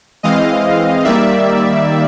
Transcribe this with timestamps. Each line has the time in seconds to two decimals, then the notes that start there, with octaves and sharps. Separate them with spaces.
0.23 E3 G#3 C4 D#5 F5
1.04 D#3 G3 A#3 D5 E5